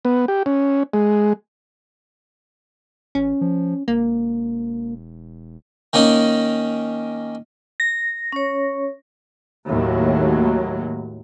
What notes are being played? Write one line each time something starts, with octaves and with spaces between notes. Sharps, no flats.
B3
G4
C#4
G#3
A1 C#4
F3
E1 A#3
D#3 A#3 C#4 D#4
A#6
C#4 C#5
D#2 A2 F#3